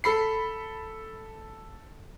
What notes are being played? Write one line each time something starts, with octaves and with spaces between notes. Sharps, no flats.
A4 B5 C7